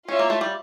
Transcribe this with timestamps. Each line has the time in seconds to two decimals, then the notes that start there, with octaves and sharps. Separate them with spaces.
0.08 C#4 F4 C#5 E5
0.19 A#3
0.30 A3
0.41 G3